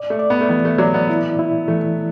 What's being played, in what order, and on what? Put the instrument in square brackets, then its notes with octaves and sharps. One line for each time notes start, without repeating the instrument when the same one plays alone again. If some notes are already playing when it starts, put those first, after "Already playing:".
Already playing: [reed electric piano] D5
[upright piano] A3
[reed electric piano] D5
[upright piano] B3
A3
[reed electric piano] E3 [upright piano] B3
[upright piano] A3
[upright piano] F#3 [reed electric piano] D5
[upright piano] B3
[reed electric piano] E4
E4
[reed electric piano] E3 [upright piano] A3